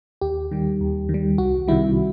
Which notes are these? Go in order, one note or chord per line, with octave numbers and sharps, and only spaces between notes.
D#2 G4
D#3 G3
D#2
D#3
G3
C2 F#4
C3 D#3 G3 E4